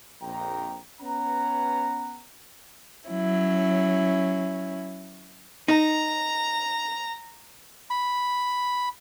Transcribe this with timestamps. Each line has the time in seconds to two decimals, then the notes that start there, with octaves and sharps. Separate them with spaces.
0.21 A#1 F2 G5 A#5
1.01 B3 C#4 B4 F#5 A#5
3.10 F#3 C#4 E4
5.68 D#4 A#5
7.90 B5